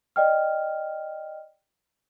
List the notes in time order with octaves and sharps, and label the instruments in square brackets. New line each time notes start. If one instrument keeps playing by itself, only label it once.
[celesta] D5 D#5 G5 F6